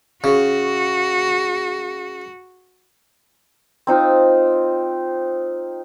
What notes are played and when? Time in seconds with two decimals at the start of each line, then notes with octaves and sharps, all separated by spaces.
0.24 C#3 F#4
3.87 C4 D#4 F4